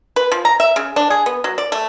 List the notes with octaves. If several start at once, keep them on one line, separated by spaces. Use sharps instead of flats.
B4
F3
A#5
E5
C#3
D4
G#4
B3
F#3
D5
A3